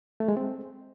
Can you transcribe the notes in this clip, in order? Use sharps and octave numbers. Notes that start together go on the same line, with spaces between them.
A3
G#3
C4